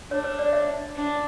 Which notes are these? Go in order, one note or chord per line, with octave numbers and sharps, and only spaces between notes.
D4 C#5
C#5
D5
E5
D4